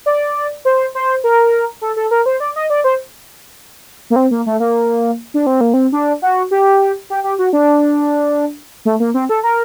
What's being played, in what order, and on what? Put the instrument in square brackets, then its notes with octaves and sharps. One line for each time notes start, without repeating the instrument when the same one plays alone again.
[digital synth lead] D5
C5
C5
A#4
A4
A4
A#4
C5
D5
D#5
D5
C5
A#3
C4
A#3
A3
A#3
D4
C4
A#3
C4
D4
F#4
G4
G4
G4
F#4
D4
A3
A#3
C4
A4
A#4